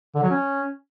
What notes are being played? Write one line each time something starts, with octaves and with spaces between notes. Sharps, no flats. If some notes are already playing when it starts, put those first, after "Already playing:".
D3
F#3
C#4